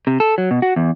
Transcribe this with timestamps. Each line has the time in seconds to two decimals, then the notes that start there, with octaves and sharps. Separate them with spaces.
0.07 C3
0.20 A4
0.38 F#3
0.51 B2
0.62 F#4
0.76 E2